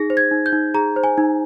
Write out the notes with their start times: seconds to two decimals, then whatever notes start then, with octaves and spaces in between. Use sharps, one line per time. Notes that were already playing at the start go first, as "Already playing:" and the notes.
Already playing: D#4 G#4 A#6
0.10 C5
0.17 G#6
0.31 D#4
0.46 G6
0.53 D#4
0.74 G#4 A#5
0.96 C5
1.04 G#5
1.18 D#4